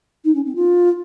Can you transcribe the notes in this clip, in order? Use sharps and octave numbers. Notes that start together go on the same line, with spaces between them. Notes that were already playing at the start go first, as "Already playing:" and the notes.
D#4
C#4
C4
F4